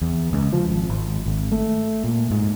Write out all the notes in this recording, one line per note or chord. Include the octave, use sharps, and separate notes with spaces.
E2
C#2
F3
G#1
G#1
G#1
A3
A#2
G#2